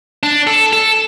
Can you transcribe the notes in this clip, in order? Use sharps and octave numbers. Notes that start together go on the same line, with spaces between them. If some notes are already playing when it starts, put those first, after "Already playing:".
D4
A4
A4